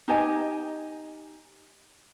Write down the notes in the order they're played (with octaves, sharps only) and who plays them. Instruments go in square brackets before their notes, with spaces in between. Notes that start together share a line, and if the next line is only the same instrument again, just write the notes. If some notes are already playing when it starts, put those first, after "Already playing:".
[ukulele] D#4 G4 D#5 G#5